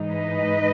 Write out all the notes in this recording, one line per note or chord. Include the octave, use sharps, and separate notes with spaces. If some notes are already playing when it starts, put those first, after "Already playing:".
Already playing: G#2 E3 G#3 D#4
B4 D#5